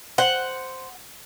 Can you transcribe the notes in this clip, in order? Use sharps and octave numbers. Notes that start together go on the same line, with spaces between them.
C5 F#5